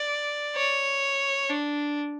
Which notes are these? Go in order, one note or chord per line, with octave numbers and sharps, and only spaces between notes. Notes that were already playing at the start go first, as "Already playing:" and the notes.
Already playing: D5
C#5
D4